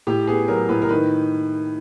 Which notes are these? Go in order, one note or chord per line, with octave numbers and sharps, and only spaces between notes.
A2 G4
B3 G#4
F#3 A#4
A2 B4
A#4
D#3 B4